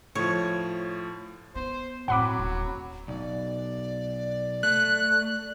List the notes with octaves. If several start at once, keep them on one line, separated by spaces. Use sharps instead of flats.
A2 F3 C#5
B3 C5
A2 F#3 C4 F#5 B5 D6
D#1
B1 D5
A3 F#6